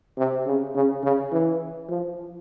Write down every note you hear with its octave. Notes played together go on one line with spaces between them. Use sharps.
C3
C#3
C#3
C#3
E3
F3